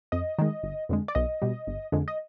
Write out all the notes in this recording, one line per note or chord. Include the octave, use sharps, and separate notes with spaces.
F2 D#5
D#3 G#3
G1
F2 D3 G#3
D5
B1 D#5
B2 G3
G1
F2 D3 G#3
D#5